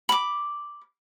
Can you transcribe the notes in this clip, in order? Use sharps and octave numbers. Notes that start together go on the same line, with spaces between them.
B5 D6